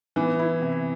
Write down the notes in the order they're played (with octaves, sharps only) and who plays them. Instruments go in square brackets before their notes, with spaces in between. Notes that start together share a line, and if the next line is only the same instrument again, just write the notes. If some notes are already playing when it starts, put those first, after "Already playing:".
[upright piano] E3 [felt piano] B3
[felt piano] E4
C3